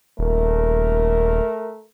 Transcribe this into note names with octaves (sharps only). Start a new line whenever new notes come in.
D#1 A3 A#4